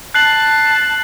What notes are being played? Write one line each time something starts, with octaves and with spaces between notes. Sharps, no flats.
A5 F#6 C7 F#7